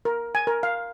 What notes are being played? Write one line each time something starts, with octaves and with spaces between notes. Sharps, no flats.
A#4
G#5
A#4
F5